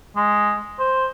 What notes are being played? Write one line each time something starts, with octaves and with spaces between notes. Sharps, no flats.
G#3
C5